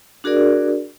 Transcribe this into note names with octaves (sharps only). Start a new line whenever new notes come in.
D4 F#4 G#4 A#4 D5